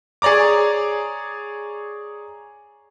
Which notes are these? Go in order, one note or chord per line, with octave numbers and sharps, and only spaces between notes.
G#4 C#5 D5 A#5 D6